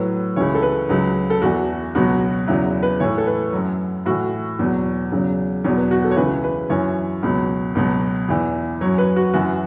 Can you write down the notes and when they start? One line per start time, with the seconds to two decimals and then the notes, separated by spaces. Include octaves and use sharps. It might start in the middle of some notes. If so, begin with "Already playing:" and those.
Already playing: A2 F#3 B4
0.36 C#2 C#3 E3 C#5
0.55 A4
0.63 B4
0.89 C#2 C#3 F#3
1.30 A4
1.42 E2 E3 F#4
1.95 C#2 B2 F#3 F#4
2.48 E2 C#3 F#3 E4
2.83 B4
3.00 A2 E3 C#5
3.18 A4
3.27 B4
3.53 F#2 F#3
4.06 A2 E3 F#4
4.59 E2 B2 F#3
5.12 E2 C#3 F#3
5.64 E2 B2 F#3 C#5
5.77 B4
5.91 F#4
6.04 A4
6.11 C#5
6.16 C#2 C#3 E3 B4
6.44 B4
6.69 F#2 E3 C#5
7.23 C#2 B2 F#3
7.75 C#2 B2 F#3
8.29 E2 E3
8.81 F#2 F#3 C#5
8.98 B4
9.16 F#4
9.34 F#2 E3 F#4